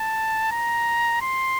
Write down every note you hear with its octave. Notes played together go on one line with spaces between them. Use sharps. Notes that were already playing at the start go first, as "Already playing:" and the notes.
Already playing: A5
A#5
C6